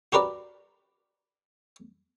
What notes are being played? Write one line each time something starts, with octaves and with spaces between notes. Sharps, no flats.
F#4 G4 A#4 B4 D5